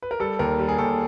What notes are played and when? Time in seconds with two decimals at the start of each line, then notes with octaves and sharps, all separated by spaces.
0.03 B4
0.11 A#4
0.20 G3 A4
0.39 D#2 A#4
0.59 G3
0.68 G#4
0.78 D#2 A4